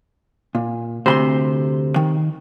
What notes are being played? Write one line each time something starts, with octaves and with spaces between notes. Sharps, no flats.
A#2
D2 C3 C5 B5 C6
D#3